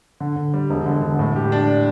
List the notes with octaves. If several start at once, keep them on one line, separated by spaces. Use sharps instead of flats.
D3
D3
G3
E1
D3
D3
A2
G4
D4